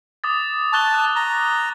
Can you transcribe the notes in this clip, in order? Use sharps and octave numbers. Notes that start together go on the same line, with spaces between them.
D6 D#6 A6
A5 C#6 F#6 G7
F#6
A#5